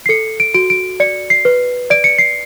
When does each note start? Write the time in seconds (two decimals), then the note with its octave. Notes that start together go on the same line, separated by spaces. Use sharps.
0.06 C7
0.09 A4 C#7
0.40 D7
0.54 F#4 D7
0.70 D7
1.00 D5 C#7
1.30 C7
1.45 B4
1.90 D5 D7
2.04 C#7
2.18 C7